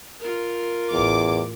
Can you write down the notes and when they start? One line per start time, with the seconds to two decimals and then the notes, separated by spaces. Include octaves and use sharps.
0.20 F4 A#4
0.92 A1 E2 D6